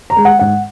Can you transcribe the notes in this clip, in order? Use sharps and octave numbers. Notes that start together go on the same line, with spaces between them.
A#5
G#3
F#5
G#2 F#5